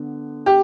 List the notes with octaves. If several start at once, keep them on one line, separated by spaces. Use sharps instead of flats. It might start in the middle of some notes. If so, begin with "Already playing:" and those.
Already playing: D3 B3
G4